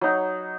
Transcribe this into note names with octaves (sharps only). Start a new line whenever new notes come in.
F#3 D#4